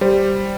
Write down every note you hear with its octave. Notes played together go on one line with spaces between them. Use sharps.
G3 C5